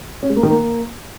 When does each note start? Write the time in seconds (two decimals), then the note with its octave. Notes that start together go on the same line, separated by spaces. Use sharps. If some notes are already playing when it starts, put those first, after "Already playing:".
0.23 C#4
0.30 G#3
0.36 A#3
0.43 D#3
0.50 A#3